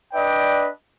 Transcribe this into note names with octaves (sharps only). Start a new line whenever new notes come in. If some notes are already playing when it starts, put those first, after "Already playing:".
D4 B4 D5 D#5 G5